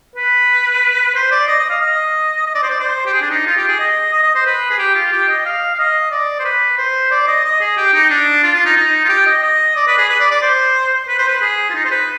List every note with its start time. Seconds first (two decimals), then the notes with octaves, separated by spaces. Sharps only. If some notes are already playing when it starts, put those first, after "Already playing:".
0.16 B4
1.15 C5
1.31 D5
1.48 D#5
1.59 D#5
1.70 F5
1.81 D#5
2.47 D#5
2.55 D5
2.63 C5
2.70 D5
2.80 C5
3.06 G4
3.13 G#4
3.22 D4
3.30 D#4
3.47 F4
3.57 G4
3.68 G#4
3.80 D#5
4.13 D#5
4.23 D#5
4.35 C5
4.46 B4
4.70 G#4
4.79 G4
4.95 F4
5.12 G4
5.29 D#5
5.46 F5
5.74 F5
5.79 D#5
6.11 D5
6.39 C5
6.45 B4
6.78 C5
7.11 D5
7.28 D#5
7.44 D#5
7.60 G#4
7.77 G4
7.94 D#4
8.10 D4
8.43 F4
8.54 F4
8.65 D#4
8.77 D#4
9.05 F4
9.09 G4
9.26 D#5
9.43 D#5
9.76 D5
9.88 B4
9.98 G#4
10.10 B4
10.20 D5
10.31 D5
10.42 C5
11.08 B4
11.19 C5
11.28 B4
11.42 G#4
11.70 F4
11.75 D#4
11.85 C5
11.91 B4